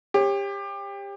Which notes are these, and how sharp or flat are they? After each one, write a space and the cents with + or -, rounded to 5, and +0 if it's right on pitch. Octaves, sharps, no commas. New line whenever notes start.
G4 +25 C#5 -25